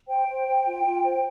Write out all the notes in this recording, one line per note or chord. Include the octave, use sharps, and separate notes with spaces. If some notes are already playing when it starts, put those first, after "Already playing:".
C5 G5
C5
C5
F4
F4
C5